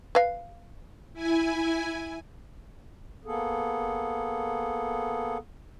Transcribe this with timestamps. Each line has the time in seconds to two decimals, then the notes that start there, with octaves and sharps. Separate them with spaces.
0.15 B4 F5
1.13 E4 G#5
3.25 A#3 B3 G#4 A4